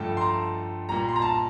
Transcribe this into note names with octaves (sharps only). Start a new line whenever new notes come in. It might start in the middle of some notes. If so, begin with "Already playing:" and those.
Already playing: G2 D3 F3 A3 G5 A5
C6
A#5
A#2 G3 A#5
C6
A#5
A5